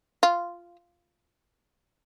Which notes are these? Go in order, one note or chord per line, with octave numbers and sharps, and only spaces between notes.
F4